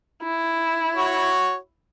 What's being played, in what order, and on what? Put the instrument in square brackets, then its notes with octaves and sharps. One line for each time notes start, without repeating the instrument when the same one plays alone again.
[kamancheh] E4
[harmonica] F#4 C#5